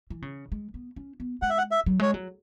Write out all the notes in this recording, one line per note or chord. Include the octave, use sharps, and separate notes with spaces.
E3
C#3
G#3
B3
C#4
B3
G#3 F#5
E5
F#5
E5
F#3
G#3 C#5
F#3